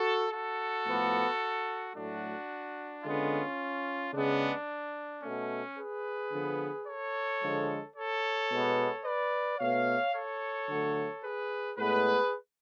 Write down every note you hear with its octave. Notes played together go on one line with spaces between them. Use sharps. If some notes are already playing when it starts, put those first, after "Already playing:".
Already playing: F#4 A4
F#4 A4
A2 F3 B3
A2 F#3 A3 D4 F#4
D3 G#3 B3 C#4 F4
C#3 G#3 B3 D4
B2 A3 C#4
G#4 B4
D3 F3 B3
A4 C#5
D3 F3 G#3
A4 C#5
B2 G#3 B3
B4 D5
B2 A3 C#5 F5
A4 C#5
D3 F#3 A3
G#4 B4
A2 G#3 B3 G#4 B4